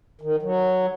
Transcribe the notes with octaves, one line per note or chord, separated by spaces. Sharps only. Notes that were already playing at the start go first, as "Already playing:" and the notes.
D#3
F#3